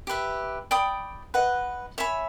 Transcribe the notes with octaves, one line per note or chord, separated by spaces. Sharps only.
G4 B4 E5
D5 G5 B5 D#6
B4 D#5 F#5
C#5 E5 G#5 B5